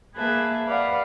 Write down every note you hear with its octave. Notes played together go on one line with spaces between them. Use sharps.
A#3 G#4 B4 E5 A5
B4 D5 F5 F#5